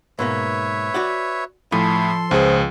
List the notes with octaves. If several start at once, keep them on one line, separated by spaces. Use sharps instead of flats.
G#2 B2 A#3 B4 C#5 E5
F#4 D5 F#5
A2 F3 A4 G#5 B5 C6
C#2 G#4 C5